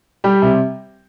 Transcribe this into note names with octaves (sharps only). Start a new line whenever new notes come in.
G3 G4
C3